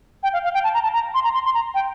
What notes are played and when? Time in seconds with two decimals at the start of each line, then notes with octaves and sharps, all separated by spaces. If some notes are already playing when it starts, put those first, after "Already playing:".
0.23 G5
0.33 F5
0.44 F5
0.54 G5
0.64 A5
0.74 A#5
0.83 A5
0.94 A#5
1.14 C6
1.24 A#5
1.34 C6
1.45 C6
1.54 A#5
1.74 G5